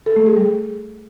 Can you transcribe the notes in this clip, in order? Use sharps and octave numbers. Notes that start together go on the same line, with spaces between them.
A4
A3
G#4
G3